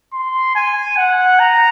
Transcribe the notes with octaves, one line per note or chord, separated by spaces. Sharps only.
C6
G#5
F#5
A#5